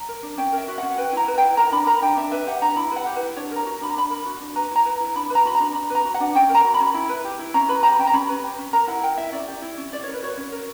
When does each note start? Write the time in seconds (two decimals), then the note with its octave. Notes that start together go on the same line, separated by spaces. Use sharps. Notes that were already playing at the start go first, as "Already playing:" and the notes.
Already playing: A#5
0.09 A#4
0.23 D4
0.38 C#4 G5
0.53 A#4
0.58 E5
0.68 F#4
0.78 C#4 F#5
0.98 B4 G5
1.13 E4 A#5
1.28 B4
1.38 E4 G5
1.57 A#4 A#5
1.72 D4 B5
1.86 A#4 A#5
2.02 D4 G5
2.17 D4 E5
2.32 B4 E5
2.47 G4 F#5
2.62 D4 A#5
2.76 E4 B5
2.92 B4 F#5
3.06 G4
3.16 E4 B4
3.36 D4 C#5
3.51 A#4 A#5
3.66 F#4
3.81 D4 B5
3.90 A#5
3.96 D4 B5
4.10 A#4
4.26 F#4
4.40 D4
4.56 B4 A#5
4.71 E4
4.76 A#5
4.85 B4
5.00 E4
5.15 D4 B5
5.30 B4
5.35 A#5
5.45 F#4 B5
5.55 A#5
5.60 D4
5.74 D4 B5
5.90 B4 A#5
6.05 F#4
6.14 F#5
6.20 D4
6.35 C#4 G5
6.49 A#4
6.55 A#5
6.64 F#4
6.74 B5
6.80 C#4
6.94 E4
7.09 B4
7.25 G4
7.39 E4
7.54 C#4 A#5
7.69 B4 B5
7.83 G4 A#5
7.99 C#4 G5
8.07 A#5
8.13 C#4 B5
8.29 B4
8.44 G4
8.58 C#4
8.73 A#4 A#5
8.87 E4 F#5
9.03 A#4 G5
9.18 E4 E5
9.32 C#4 D5
9.48 G4
9.62 E4
9.77 C#4
9.92 C#4 D5
10.03 A#4 C#5
10.13 B4
10.23 F#4 C#5
10.37 C#4
10.52 A#4